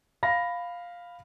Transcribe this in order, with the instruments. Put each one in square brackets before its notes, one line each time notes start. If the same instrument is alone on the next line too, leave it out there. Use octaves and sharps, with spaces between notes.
[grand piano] F5 B5 A#6